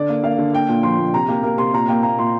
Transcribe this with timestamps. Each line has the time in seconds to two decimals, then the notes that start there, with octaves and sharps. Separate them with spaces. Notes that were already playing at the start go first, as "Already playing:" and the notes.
Already playing: D3 D5
0.09 A#3
0.23 A#3 F5
0.38 D3
0.54 A#3 G5
0.69 A#2
0.83 F3 C6
0.98 A#2
1.14 C3 A#5
1.28 A#3 G4
1.43 A#3 A#4
1.58 C3 C6
1.73 A#2 A#5
1.88 A#3 G5
2.03 A#3 A#5
2.19 A#2 C6